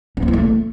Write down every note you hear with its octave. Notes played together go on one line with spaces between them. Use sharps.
C#4
C4
E4
A3